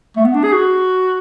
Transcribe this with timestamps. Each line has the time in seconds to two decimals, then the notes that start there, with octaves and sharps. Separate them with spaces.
0.17 A3
0.25 B3
0.34 D4
0.44 G#4
0.53 F#4